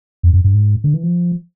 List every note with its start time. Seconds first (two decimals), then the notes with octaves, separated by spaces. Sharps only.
0.23 F2
0.33 F#2
0.44 G2
0.54 G#2
0.84 D3
0.94 E3
1.03 F3